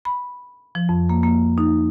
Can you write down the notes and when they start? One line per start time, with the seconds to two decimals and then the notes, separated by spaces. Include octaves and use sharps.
0.05 B5
0.75 F3
0.89 F2
1.09 A#3
1.23 A#3
1.58 D#4